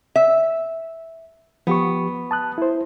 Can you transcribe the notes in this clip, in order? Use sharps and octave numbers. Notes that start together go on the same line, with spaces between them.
E5
F3 B3 G4 C#6
A5 D#6 F#6
E4 C5